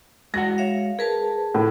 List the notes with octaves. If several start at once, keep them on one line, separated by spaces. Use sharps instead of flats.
G#3 F#4 F#5 A#6
C#5 E5 F5
G#4 A#4 B4 A5
A2 C#3